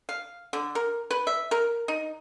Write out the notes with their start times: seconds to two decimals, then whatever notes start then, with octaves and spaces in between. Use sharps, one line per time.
0.09 F5
0.53 D3
0.75 A#4
1.11 B4
1.27 E5
1.51 A#4
1.88 D#4